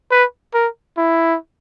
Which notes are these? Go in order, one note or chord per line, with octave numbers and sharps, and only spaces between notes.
B4
A#4
E4